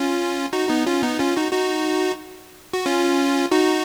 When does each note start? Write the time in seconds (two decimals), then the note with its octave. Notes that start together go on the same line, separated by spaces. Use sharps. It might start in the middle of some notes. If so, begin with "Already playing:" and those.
Already playing: C#4 F4
0.53 D#4 F#4
0.69 B3 D#4
0.86 C#4 F4
1.03 B3 D#4
1.19 C#4 F4
1.36 D#4 F#4
1.52 D#4 F#4
2.73 F#4
2.86 C#4 F4
3.51 D#4 F#4